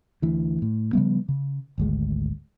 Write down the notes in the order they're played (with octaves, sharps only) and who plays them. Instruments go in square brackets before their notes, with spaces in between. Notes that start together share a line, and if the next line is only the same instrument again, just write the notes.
[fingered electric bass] D2 E3
A2
C#3 F3 G3 B3
C#3
G#1 D2 G#3